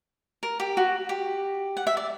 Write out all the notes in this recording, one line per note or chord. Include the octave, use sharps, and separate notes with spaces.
A#4
G4
F#4
G4
F#5
E5
D5